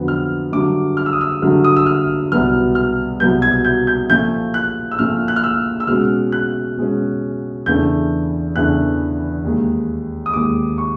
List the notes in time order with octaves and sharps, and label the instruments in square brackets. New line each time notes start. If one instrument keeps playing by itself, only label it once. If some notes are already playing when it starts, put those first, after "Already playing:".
Already playing: [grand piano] F2 D3 F#3 B3
F6
G2 D3 F#3 A3 D6
F6
E6
D#6
E6
G2 D3 F#3 A3 F6
D#6
E6
F6
C2 B2 F#3 B3 F6
F6
C2 B2 F#3 B3 G6
G#6
G6
G6
A#2 F3 A3 G6
F#6
E6
A#2 F3 A3 F6
F#6
F6
E6
E6
B2 G#3 C#4 F6
F#6
B2 G#3 C#4
E2 C#3 E3 A3 D4 G6
E2 C#3 E3 A3 D4 F#6
D#2 D#3 G#3
D#6
D#2 D#3 G#3 D6
C#6